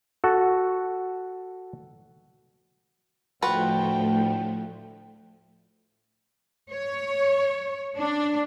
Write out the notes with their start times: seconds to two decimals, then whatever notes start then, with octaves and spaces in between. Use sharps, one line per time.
0.24 F#4 A4
3.42 D2 A2 F3 A3 F4 F#4 B4 G5
6.72 C#5
7.97 D4